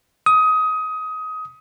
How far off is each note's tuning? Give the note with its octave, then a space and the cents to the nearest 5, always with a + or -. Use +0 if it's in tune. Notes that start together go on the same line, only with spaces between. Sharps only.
D#6 +20